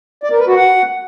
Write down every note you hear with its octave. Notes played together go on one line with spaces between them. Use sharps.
D5
A#4
B4
F#4
F#5